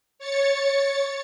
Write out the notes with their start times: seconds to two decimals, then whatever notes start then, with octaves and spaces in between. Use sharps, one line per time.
0.19 C#5 A6 C#7